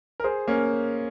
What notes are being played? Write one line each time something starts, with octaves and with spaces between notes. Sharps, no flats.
A#4
G#4 C5
A#3 C#4